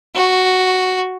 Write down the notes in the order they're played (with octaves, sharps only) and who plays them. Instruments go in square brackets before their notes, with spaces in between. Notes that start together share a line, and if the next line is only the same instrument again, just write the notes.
[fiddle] F#4